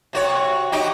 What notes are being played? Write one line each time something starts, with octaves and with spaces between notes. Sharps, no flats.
C3 F#4 C#5
D#4 F#4 G4